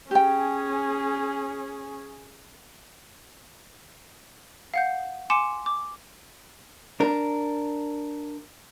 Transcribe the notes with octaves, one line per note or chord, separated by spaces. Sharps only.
C#4 G4 G#4 G5
F5 F#5 G6
G#5 C6 D6 C#7 E7
D6
D4 A#4